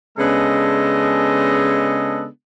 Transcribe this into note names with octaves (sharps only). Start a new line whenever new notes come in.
C#3 G#3 B3 D4 A4 D#5